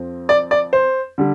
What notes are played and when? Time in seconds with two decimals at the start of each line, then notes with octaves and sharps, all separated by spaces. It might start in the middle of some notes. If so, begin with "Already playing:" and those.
Already playing: F2 F3 C4
0.29 D5
0.51 D5
0.73 C5
1.18 D3 G3